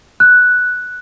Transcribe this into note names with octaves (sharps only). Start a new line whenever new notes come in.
F#6